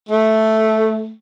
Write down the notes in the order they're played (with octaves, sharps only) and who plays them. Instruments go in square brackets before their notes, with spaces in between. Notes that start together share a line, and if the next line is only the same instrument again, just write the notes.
[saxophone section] A3